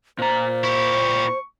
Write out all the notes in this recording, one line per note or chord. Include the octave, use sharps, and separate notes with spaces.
A#2 C5 A#5
E4 G4 C#6